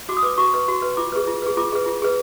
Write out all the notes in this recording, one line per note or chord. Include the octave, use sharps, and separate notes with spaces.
F#4 D6
D#6
B4 D6
F#4 C#6
B4
F#4
B4
F4 D6
G#4 B4
F4
G#4 B4
F4 D6
G#4 B4
F4
G#4 B4